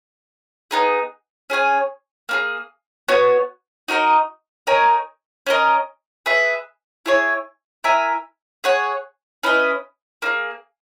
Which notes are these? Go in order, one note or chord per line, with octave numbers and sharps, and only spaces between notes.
B3 D#4 G#4
C#4 G#4 C#5 G#5
A#3 D#4 G#4
B3 F#4 C#5
D#4 F#4 A#4 D#5
D#4 A#4 C#5 G#5
C#4 F#4 A#4 D#5
G#4 B4 E5
E4 G#4 C#5
E4 A#4 E5 G#5
G#4 C#5 F#5
C#4 E4 B4 D#5
A#3 D#4 G#4